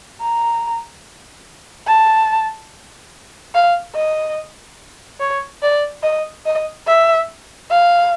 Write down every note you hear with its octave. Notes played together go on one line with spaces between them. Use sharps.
A#5
A5
F5
D#5
C#5
D5
D#5
D#5
E5
F5